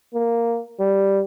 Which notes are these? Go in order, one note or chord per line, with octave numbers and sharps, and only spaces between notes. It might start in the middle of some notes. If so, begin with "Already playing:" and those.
A#3
G3